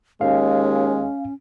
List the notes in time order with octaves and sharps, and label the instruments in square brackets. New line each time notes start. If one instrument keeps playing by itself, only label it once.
[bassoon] D#2 [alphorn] G#3 [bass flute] C#4 [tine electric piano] F5